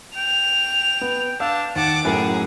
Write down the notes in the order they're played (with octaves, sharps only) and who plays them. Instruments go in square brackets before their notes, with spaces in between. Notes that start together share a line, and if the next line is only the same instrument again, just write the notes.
[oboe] G5 [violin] F7
[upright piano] B3
[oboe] D4 [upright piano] F5 E6 [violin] A5
[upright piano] D#2 [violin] F#5 D6 [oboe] A5
[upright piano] F#2 A2 A#4 [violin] G#4 [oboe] F#5